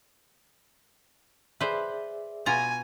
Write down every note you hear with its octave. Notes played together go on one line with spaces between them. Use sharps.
G#4 B4 C5 D5 E5
B2 F4 G#5 A#5